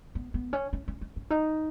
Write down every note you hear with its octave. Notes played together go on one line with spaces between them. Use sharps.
B3
B3
C#4
C#4
C#4
C#4
C#4
D#4